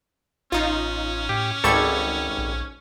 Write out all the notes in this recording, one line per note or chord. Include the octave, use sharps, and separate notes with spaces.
A1 C#4 D#4 F4
A2 G4
G#1 C#2 G#2 G3 A4 C#6 G#6
A#1